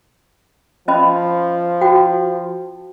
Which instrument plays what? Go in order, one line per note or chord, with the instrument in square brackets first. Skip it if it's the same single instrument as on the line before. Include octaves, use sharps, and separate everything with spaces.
[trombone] F3 [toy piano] C#4 D#5 B5
[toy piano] F#4 G5